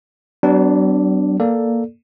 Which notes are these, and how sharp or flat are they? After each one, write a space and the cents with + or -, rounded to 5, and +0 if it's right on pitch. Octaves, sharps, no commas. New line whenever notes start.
F#3 +45 B3 +35 D4 +0
A#3 +0 A4 +0 D5 +0